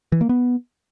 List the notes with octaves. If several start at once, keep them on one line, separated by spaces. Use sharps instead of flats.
E3
A#3
B3